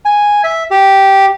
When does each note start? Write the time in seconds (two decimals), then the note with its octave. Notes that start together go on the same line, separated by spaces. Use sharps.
0.05 G#5
0.44 E5
0.71 G4